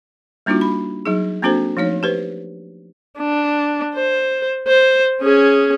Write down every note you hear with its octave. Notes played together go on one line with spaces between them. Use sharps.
G3 A#3 D4 D#4 F4 F#4
B5
F#3 D#4 G#4
A#3 C4 D4 F#4 A4 C5
F3 A3 D#4 C#5
G4 B4 C5
D4
C5
C5
C#4 G#4